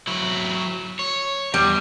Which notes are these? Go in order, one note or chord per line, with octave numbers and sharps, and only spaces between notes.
F#3 E4
C#5
E2 G3